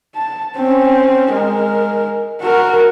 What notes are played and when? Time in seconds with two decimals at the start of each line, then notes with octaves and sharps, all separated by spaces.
0.15 A5
0.57 C4 C#4
1.32 G#3 A#4
2.42 F#4 A#4